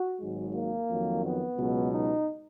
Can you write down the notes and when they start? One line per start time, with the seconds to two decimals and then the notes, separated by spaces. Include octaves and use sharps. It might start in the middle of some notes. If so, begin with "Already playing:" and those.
Already playing: F#4
0.20 G#1 G#2 F#3 G#3
0.55 A#3
0.90 F2 D#3 F#3
1.24 B3
1.58 C#2 B2 F#3
1.92 D#4